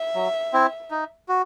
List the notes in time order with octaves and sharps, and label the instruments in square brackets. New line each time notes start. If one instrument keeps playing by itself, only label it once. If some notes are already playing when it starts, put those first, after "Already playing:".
Already playing: [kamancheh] E5
[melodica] F#3
C4 E4
D#4
F#4